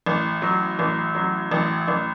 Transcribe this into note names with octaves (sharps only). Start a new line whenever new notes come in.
A1
F#3
A1
F#3
A1
A1